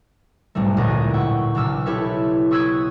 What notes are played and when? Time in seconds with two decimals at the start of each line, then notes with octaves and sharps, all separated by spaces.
0.55 B1 G#2 G3 A3
0.77 A1 D2 A#2 G#4 D5 D#5
1.13 F#5 G5 C#6 E6
1.55 B1 C#3 D4 D6 E6 F6
1.86 E4 G4 A4 B4 C#5 E5
2.51 C#6 D#6 E6 F#6 G#6 B6